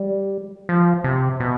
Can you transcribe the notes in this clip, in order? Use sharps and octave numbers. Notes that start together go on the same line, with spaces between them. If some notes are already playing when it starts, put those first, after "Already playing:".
Already playing: G3
F3
C3
B2